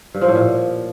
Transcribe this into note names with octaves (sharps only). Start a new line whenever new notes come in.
G2
F3
A2
A#2